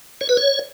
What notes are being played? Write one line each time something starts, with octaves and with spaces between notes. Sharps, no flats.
C#5
B4
C#5